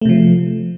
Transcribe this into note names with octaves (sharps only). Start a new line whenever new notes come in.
C3 F3 A3